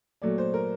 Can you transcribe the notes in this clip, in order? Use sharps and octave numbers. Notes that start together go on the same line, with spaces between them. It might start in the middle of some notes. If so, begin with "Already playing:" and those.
A#2 F#3 A3 D5
C5
A#4